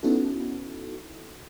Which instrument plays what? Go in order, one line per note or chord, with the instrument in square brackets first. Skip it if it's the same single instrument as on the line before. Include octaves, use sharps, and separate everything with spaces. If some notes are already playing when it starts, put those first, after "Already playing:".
[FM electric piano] B3 C#4 D#4 E4 F#4 A4